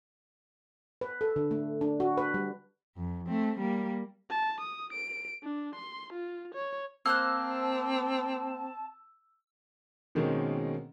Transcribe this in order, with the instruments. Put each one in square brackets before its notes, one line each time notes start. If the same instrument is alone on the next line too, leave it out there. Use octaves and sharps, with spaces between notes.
[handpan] B4
A4
D3
A3
D4
F#4
B4
G3
[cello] F2
A3 C4
G3 A#3
[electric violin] A5
D#6
D7
D4
C6
F4
C#5
[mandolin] A#3 C5 F#6 [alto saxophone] C4 [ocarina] A5 [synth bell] E6
[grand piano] B2 D#3 G#3 A#3 C4 C#4